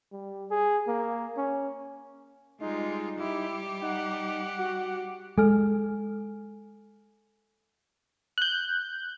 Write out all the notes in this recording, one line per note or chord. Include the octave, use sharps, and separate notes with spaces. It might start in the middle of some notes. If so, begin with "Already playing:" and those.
G3
G#4
A#3
C#4
G3 G#3 D#4 F4
G3 E4 G4
D#4 F#5
F#4
G#3 A4 G#5 F6
F#6 G6